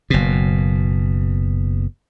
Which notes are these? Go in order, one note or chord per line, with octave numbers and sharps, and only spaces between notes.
F#1 B2